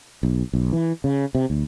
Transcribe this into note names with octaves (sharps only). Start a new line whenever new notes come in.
B1
B1
E3
C#3
C3
D2